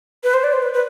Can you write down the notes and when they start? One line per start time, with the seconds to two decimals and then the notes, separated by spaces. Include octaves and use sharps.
0.24 B4
0.34 C5
0.43 D5
0.53 C5
0.62 B4
0.73 B4